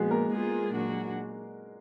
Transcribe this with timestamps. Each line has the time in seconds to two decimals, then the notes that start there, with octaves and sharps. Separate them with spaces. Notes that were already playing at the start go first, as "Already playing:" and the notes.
Already playing: A#2 F3 G#3 B3 F#4 G#4
0.10 A#3 A#4
0.31 G#3 B3 F4 G#4
0.71 A#2 F#3 D4 F#4